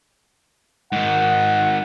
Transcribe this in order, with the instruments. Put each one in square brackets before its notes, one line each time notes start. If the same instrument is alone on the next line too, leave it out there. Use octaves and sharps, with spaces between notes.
[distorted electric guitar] G#2 D#3 [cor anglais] F#5